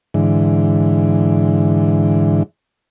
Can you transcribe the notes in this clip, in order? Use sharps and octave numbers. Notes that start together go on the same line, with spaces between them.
G#2 D3 E3